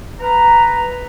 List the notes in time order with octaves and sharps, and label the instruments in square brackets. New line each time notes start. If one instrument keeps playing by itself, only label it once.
[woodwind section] B4 A#5